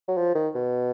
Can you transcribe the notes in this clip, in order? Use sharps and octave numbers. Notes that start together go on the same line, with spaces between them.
F#3
F3
D#3
B2